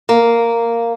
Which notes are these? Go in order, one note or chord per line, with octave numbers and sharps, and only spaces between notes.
A#3